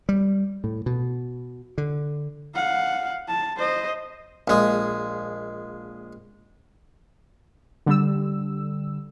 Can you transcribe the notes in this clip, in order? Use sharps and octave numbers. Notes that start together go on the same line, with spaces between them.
G3
A2
B2
D3
F5 F#5
A5
C5 D#5
A#1 G#3
D3 G3 E6